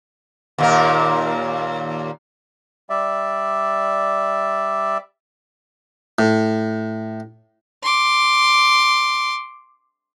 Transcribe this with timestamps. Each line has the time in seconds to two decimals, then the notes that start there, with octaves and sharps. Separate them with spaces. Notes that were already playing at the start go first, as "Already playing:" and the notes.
0.58 D#2 A#2 A#4
2.90 G3 D5 E5
6.19 A2
7.83 C6 D6